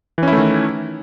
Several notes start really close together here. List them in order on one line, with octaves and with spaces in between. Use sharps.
E3 C#4 E4 A3 D#3